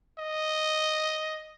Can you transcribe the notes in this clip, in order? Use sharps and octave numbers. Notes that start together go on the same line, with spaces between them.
D#5